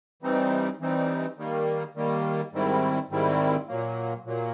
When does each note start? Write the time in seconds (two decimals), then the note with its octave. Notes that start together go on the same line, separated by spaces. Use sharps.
0.23 E3 G3 C4 D#4
0.80 E3 G3 C4 D#4
1.38 D#3 G3 A#3
1.95 D#3 G3 A#3
2.53 G#2 D#3 G3 C4 E4
3.10 G#2 D#3 G3 C4 E4
3.68 A#2 F#3 A#3
4.25 A#2 F#3 A#3